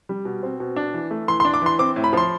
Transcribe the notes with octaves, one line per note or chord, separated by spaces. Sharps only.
G3
B2
C4
B2
D4
E3
A3
E3 C6
C6
D4
D6
E3 C6
C4 D6
A2
B5
F3 C6